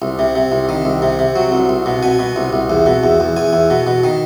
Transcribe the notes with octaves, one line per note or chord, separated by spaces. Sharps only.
C2
C3
C3
C2
D#3
C2
C3
C3
F#3
C2
C2
B2
B2 G#5
B2
C2
C2
E2
B2
E2
E2
E2 G#5
E2
B2
B2
D#3